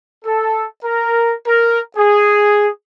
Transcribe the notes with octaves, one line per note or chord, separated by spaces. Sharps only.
A4
A#4
A#4
G#4